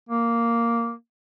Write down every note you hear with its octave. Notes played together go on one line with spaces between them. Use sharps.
A#3